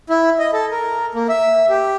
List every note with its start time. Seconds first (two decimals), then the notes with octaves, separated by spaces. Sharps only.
0.10 E4
0.39 D#5
0.53 A4
0.71 A#4
1.14 A#3
1.29 E5
1.70 G4